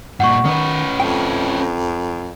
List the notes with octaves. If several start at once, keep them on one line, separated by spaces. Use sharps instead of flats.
G2 A#2 F#5 C#6
D#3 C#4 B4
F2 G5